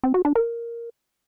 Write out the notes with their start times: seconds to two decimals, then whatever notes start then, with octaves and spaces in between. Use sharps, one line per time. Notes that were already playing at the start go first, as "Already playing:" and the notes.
0.04 C4
0.14 F#4
0.25 D4
0.35 A#4